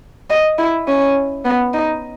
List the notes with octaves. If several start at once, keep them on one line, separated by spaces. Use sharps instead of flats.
D#5
E4
C#4
B3
D#4